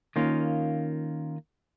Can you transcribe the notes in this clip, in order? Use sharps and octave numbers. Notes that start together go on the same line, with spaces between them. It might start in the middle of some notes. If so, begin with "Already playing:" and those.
D#3 A#3 C#4 F4